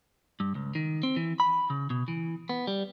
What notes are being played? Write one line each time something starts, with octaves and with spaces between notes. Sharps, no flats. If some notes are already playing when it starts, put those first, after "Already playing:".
G2
C#2
D#3
C4
E3
B5
C#3
B2
E3
B3
G3